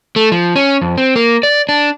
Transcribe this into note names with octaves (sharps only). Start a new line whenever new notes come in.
A3
F3
C#4
F2
C4
A#3
D5
D4